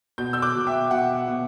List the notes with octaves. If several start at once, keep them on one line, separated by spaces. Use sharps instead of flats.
B2 G6
E6 G6
D6 F#6
B2
E5 G5
B2 F#5
B2